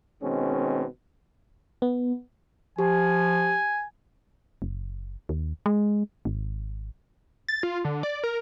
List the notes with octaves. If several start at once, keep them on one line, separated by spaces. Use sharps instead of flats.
B2 D#3 G#3 C4 C#4
B3
F3 G4 G#5
F#1
D#2
G#3
G#1
A6
F4
D3
D5
A#4